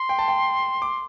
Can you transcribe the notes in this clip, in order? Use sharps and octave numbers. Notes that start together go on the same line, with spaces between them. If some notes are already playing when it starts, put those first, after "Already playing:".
Already playing: C6
G5
A5
G5
D6